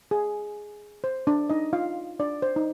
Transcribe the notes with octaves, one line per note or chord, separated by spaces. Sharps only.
G#4
C5
D4 D5
D#4 D#5
F4 F5
D4 D5
C5
D#4